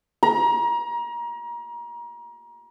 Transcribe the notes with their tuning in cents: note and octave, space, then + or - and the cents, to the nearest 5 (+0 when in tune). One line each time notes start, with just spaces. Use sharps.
A#5 +30